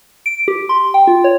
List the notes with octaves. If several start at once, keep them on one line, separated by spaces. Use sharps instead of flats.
D7
G4
C6
G5
F4
C#5